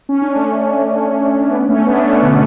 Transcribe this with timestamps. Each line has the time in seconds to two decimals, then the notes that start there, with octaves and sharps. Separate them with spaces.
0.09 C#4
0.22 D4
0.35 A3 C#4
1.51 B3 D4
1.69 A3 C#4
1.86 B3 D4
2.04 A3 C#4
2.22 B2 D3